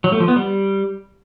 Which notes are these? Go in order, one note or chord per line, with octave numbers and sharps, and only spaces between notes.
F#3
A3
F3
B3
G3